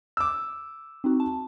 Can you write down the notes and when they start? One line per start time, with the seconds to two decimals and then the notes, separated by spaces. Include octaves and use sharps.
0.17 D6 E6
1.04 C4 D#4 F#4
1.20 A5